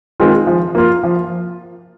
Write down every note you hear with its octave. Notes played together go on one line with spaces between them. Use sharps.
D#3 G#3 C4 F4
F3
A#3 F4
F3